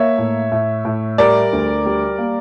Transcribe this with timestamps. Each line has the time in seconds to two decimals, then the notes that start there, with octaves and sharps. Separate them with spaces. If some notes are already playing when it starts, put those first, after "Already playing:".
Already playing: A#3 C#5 E5
0.18 A2
0.52 A2
0.85 A2
1.18 G3 A#4 D5
1.53 D2
1.85 G3
2.18 A#3